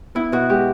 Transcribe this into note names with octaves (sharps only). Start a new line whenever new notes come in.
B3 E4
B2 F#4
G#3 G4